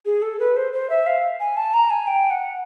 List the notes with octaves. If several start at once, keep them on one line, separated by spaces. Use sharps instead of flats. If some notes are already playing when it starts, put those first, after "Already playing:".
G#4
A4
B4
C5
C5
E5
F5
G#5
A5
A#5
G#5
G5
F#5